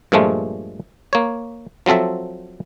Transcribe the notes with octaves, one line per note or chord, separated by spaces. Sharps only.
G2 A#2 F3 G#3 A3
A#3 C#5
F3 F#3 C4 A4 E5